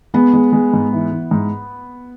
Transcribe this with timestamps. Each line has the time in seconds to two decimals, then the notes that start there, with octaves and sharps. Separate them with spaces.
0.14 G#3 B3
0.34 G#3
0.53 G#3
0.73 G#2
0.93 E3
1.11 E3
1.31 G#2